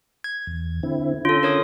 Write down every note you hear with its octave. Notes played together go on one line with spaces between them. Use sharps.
G#6
E2
D3 C4 E4
D3 C#4 F4 A4
A#4 C#5 D#6